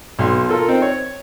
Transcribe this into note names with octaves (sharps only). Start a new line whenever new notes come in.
B1 F#3 C6
F4 A4 A#4
C4 D#4
C#5